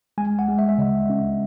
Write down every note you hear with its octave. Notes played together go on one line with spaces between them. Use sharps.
G#3 G#5
F#5
G#3
E5
E5
C#3 D#5
C#4